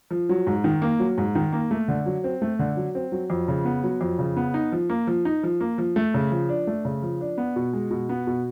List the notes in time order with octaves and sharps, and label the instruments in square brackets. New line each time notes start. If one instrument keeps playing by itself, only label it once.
[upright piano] F3
F#3
G#2
D#3
A#3
F#3
G#2
D#3
A#3
A3
D3
F#3
C4
A3
D3
F#3
C4
F#3
F2
C#3
B3
F#3
F2
C#3
B3
D#4
F3
A#3
F3
D#4
F3
A#3
F3
A3
C#3
F3
D4
A3
C#3
F3
D4
B3
B2
G#3
B2
B3
B2